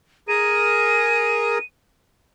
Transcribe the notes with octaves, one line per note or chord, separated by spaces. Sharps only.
G#4 A#4 D#7